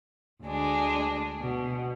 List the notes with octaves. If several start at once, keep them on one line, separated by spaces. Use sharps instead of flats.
D2 G#3 D4
B2